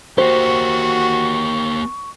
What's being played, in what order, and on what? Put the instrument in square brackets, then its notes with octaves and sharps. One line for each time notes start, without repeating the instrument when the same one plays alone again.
[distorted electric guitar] A#3 G4 [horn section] F#4 [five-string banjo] C5 [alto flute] C#6